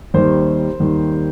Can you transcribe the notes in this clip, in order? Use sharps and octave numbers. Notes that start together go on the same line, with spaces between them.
D#2 D#3 G3 C5
D#2 D#3 G3